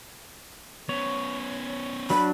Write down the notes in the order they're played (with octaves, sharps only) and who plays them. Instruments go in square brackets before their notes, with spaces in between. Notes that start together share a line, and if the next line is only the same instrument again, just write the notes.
[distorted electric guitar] B3 C#4 [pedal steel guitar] C#5
[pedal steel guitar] F#3 D4 [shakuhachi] B5